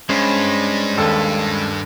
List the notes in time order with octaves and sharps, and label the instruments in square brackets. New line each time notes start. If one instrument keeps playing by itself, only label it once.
[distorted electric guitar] G2 [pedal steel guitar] G#3 C#4 C5
[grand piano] D#2 A4